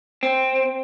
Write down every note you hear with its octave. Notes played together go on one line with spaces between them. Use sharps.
C4